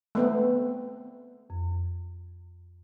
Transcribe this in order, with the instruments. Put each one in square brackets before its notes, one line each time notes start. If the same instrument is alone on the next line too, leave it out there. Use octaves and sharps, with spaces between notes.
[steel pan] A3 B3 C4
[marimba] F2